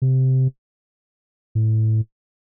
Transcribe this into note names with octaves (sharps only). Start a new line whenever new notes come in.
C3
A2